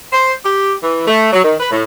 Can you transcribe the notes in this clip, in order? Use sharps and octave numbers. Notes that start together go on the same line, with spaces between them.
C5
G4
E3
A3
F#3
D#3
B4
A2